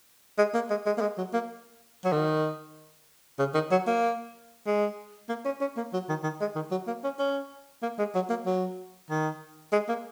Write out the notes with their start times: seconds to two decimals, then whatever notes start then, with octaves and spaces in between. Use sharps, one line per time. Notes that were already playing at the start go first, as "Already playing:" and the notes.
0.38 G#3
0.54 A#3
0.70 G#3
0.86 G#3
0.97 A#3
1.01 G#3
1.18 F#3
1.34 A#3
2.05 F#3
2.12 D#3
3.39 C#3
3.54 D#3
3.71 F#3
3.87 A#3
4.66 G#3
5.29 A#3
5.45 C#4
5.61 C#4
5.77 A#3
5.93 F#3
6.09 D#3
6.24 D#3
6.41 G#3
6.55 D#3
6.71 F#3
6.87 A#3
7.04 C#4
7.19 C#4
7.83 A#3
7.99 G#3
8.15 F#3
8.30 A#3
8.46 F#3
9.10 D#3
9.72 G#3
9.89 A#3